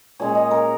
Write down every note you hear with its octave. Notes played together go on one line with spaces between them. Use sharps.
A#2 G#3 C#4 C#5
D#5
A#4